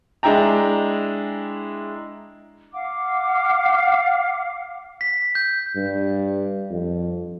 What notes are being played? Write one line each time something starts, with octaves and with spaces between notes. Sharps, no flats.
G#3 D4 E4 G5 A#5
F5 F#5 D6
B6
G6
G2
F2